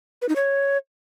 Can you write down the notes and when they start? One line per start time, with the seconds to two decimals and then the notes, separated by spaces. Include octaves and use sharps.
0.22 B4
0.29 D#4
0.36 C#5